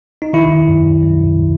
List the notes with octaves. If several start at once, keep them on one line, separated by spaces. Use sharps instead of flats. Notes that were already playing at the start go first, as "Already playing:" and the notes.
D#4
D#3 E4
F#2
F#2